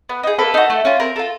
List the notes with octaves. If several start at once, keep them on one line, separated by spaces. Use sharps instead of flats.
B3
D#4 G#4
A#3 A4 B4
D#4 F#4
A3
C#4 F4
C4 A#4
F4 A4